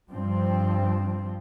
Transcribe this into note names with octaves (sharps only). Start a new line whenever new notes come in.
G2 F3 C4